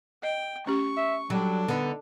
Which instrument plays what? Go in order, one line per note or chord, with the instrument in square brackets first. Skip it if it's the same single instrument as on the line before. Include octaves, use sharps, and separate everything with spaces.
[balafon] D#5 [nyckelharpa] G5
[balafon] A3 C#4 G4 [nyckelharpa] C#6
[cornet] E5
[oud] F#3 [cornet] G3 [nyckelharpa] D4 A4
[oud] D3 D#4 [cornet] B3